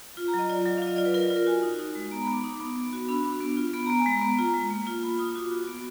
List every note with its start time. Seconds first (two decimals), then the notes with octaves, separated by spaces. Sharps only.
0.17 F4
0.28 A#5
0.34 F#3 D#5
0.50 F4 D5
0.65 F#3
0.78 F5
0.82 F4 D#5
0.96 F4 D5
1.05 B4
1.14 F4 A#4
1.25 D5
1.30 F4
1.36 A#4
1.47 F#4 G#5
1.63 D#4
1.79 D#4
1.95 G#3
2.11 B3 A#5
2.22 B5
2.27 B3
2.33 D6
2.44 D#4 D6
2.60 B3
2.76 B3
2.93 F#4
3.09 D4 B5
3.25 D4
3.41 B3
3.57 F4
3.73 B3 B5
3.86 B3 A#5
3.99 G#5
4.06 G#3
4.12 A#5
4.21 B3
4.38 F4 A#5
4.54 G#3
4.70 A#3
4.87 F4
5.03 F4 B5
5.19 F4 D#6
5.35 F#4 D6
5.51 F#4
5.68 B3